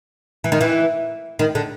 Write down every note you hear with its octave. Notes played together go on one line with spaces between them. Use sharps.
E3
D#3
E3
D#3
D3